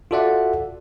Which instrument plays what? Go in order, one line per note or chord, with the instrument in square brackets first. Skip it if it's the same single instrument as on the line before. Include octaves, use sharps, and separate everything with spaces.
[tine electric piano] F4 F#4 A4 D5 E5 F#5